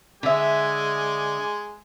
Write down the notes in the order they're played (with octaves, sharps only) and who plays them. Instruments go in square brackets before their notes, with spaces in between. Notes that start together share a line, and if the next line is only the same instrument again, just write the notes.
[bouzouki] D3 E5 [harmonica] G#3 G#5 D6